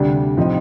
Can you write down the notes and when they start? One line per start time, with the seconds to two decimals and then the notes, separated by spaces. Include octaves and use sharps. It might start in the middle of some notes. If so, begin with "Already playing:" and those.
Already playing: D2 C3 G3 D4
0.37 A2 F3 C4 D#4